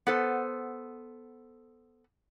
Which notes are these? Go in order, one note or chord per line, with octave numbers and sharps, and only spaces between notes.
B3 A4 C5